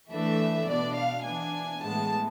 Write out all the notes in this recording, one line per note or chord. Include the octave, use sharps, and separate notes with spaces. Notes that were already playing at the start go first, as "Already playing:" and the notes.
E3 A3 D4 E5
B2 B3 D4 D5
F5
E3 B3 D4 G#5
A2 E3 G#3 B3 A5